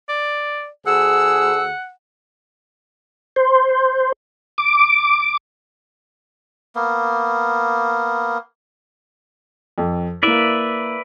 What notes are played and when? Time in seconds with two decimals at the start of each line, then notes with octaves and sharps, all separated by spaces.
0.09 D5
0.86 D2 G#4 F#5 E6
3.36 C5
4.58 D6
6.75 A#3 B3
9.78 F2
10.23 A#3 E4 B4 D5 E5